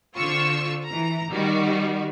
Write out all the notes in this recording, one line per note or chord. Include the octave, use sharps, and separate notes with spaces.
D3 C4 F4 C#6 E6
E3 A#5
D#3 G3 F#4